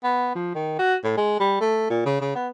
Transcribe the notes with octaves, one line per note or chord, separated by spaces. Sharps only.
B3
F3
D#3
F#4
A2
G#3
G3
A3
A#2
C#3
C#3
B3